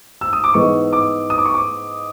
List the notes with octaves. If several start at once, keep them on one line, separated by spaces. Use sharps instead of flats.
E6
D#6
D6
G#2 E3 G#3 B3 C#6
D6
D#6
D6
C#6
D6